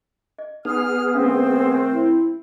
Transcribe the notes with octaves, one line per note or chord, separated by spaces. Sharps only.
D#5
B3 D#4 G#4 F6
D#3 A3 C4 C#4 F5
E4